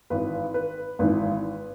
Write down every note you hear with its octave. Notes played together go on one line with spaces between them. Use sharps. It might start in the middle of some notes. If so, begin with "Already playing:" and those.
G#1 G#2 E3 B4
B4
G#1 G#2 E3 B4